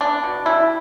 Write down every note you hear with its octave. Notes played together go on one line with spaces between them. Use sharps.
B3 D4
B2
G3 E4